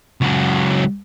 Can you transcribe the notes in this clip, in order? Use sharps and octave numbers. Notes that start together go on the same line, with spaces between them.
C#2 F#3